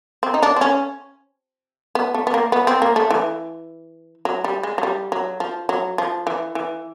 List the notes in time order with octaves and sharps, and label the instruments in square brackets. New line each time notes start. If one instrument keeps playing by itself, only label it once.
[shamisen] C4
D#4
D4
C4
C#4
B3
A3
B3
A#3
B3
C4
A#3
A3
E3
F#3
G3
G#3
F#3
G3
F#3
F3
F#3
F3
E3
E3